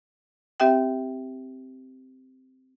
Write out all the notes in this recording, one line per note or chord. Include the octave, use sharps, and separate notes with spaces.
C4 G4 E5 G5